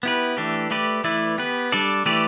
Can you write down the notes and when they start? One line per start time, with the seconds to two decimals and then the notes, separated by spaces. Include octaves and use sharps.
0.03 B3 E4 G4 B4
0.37 E3 A3 D4 G4
0.71 A3 G4 B4 D5
1.04 E3 A3 E4 B4 D5
1.38 B3 G4 B4
1.72 G3 D4 A4 D5
2.06 E3 A3 G4 B4 D5